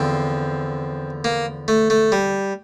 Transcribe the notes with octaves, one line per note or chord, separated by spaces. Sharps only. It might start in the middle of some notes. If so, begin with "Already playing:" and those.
Already playing: E2 D3 F3 C4
A#3
A3
A3
G3